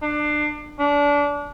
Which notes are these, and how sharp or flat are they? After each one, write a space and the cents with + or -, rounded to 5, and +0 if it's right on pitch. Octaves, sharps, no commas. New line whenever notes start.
D4 +25
D4 -25